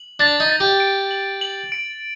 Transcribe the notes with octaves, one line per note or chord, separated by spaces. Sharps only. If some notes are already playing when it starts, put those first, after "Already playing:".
Already playing: F#7
D4 A6
D#4
A6
G4
D7
F#7
F#7
D7